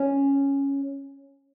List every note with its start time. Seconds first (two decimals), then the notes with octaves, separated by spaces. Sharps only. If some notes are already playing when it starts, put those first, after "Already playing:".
Already playing: C#4